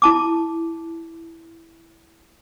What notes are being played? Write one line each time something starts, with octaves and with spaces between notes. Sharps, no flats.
E4 A5 D6